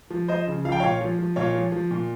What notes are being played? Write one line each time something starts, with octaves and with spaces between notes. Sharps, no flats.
F3
F3 C5 D#5
C#3
F3 F5
G5
A#2 C#5 F5
F3
F3
A#2 C#5 F5
F3
F3
A#2